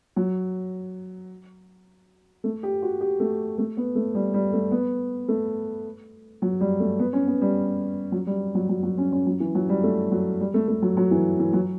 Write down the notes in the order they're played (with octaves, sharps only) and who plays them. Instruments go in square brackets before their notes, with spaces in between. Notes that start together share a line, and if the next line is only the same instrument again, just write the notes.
[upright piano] F#3
A3
G4
F#4
G4
A3
A3
B3
A3
G3
G3
A3
B3
A3
F#3
G3
A3
B3
C#4
B3
G3
F#3
G3
F#3
F#3
F#3
C#4
C#4
F#3
E3
F#3
G3
A3
F#3
G3
A3
A3
F#3
F#3
E3
E3
F#3